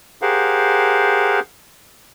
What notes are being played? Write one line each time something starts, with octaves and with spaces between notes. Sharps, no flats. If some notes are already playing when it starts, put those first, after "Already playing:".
G4 G#4 A#4 C5 F5 F#5